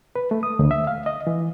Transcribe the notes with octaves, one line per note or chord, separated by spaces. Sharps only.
B4
A3
D#6
D2
E5
F5
D#5
E3